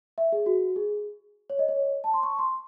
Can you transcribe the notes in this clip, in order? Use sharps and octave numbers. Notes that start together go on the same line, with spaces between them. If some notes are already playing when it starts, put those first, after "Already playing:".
E5
G#4
F#4
G#4
C#5
D#5
C#5
A5
C6
C#6
C6